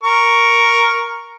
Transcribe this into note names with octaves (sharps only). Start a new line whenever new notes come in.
A#4 C#6